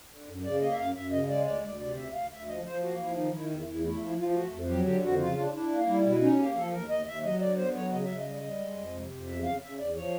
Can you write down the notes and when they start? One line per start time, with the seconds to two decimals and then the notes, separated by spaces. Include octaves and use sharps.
0.10 D3
0.27 F#2
0.43 C#3 D5
0.60 A#3 D#5
0.71 E5
0.78 F#2 F5
0.95 F#2 E5
1.11 C#3 D#5
1.29 G#3 D5
1.45 D2 D5
1.63 D2 D5
1.80 C3 D5
1.96 D2 E5
2.14 D2 F5
2.31 D2 E5
2.47 F3 D#5
2.65 F3 C5
2.82 A#3 F#4
2.99 F3 E4
3.15 D#3 D#4
3.32 D#3 E4
3.50 E2 E4
3.66 E2 E4
3.84 A3 E4
4.00 F3 E4
4.18 F3 F4
4.29 F4
4.35 A3 F#4
4.51 F2
4.69 F#3 G4
4.85 D3 G4
5.02 F2 F#4
5.19 C#3 F4
5.37 D4
5.54 D4 E4
5.71 A#3
5.87 G3 E4
6.04 B2 E4
6.21 C#4 D#4
6.38 A#3 G4
6.55 F3 A4
6.73 D#2 A#4
6.89 D#2 D#5
7.07 D#2 E5
7.23 F#3 D#5
7.41 D3 D5
7.57 B3 C5
7.74 F#3 C#5
7.92 C#3 D#5
8.04 C#3 E5
8.17 D#5
8.25 G3
8.42 G3
8.59 G#3
8.77 F2
8.94 C3
9.10 F2
9.27 E2 E5
9.44 C#3 F5
9.61 C#3 E5
9.78 E2 D5
9.95 F3 C#5